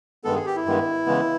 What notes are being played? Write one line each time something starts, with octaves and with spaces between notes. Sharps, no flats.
G2 D#3 G#3 B3 A4
G#4
G4
E4
G2 D#3 G#3 B3
C#3 E3 G#3 B3